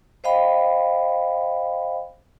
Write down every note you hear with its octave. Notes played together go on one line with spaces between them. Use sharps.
C5 D#5 F5 G5 B5